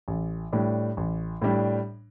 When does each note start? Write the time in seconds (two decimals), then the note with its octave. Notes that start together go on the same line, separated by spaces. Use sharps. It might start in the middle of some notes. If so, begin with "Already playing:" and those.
0.08 A1
0.53 A2 G3 D4
0.97 A1
1.42 A2 G3 D4